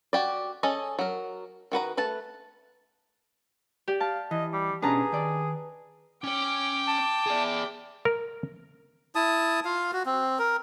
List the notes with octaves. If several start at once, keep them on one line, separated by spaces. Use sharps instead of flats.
F#4 G4 D5
C#4 G#4 A4 D#5
F#3 A#4
D#3 F#4 B4 A#5
A3 B4 A5
G4 D5
F5 A5
E3 D#5
G3
B2 C#4 D4 G#4 B4 A5 A#5
D#3 D5
C#4 C#5 G5 D6
A5
G#4 D5
A#4
E4 A5 D#6
F4 F5
F#4
C4
A#4